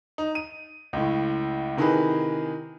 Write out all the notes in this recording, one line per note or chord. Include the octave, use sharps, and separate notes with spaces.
D#4
D#7
C#2 A2
C3 D#3 E3 G#4 B4